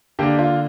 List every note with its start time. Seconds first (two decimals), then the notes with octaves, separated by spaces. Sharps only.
0.19 D3 A#3 D4 G4
0.39 F4